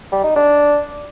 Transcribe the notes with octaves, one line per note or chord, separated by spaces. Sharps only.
G3
D#4
D4